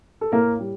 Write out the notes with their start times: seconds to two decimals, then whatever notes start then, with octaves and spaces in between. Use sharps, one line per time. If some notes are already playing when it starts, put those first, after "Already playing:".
0.21 A4
0.32 A2 A#3 A#4
0.59 G3